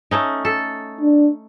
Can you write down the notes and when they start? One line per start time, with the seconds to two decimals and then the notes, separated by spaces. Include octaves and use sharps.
0.11 A3 C#4 D#4
0.45 A4
1.01 D4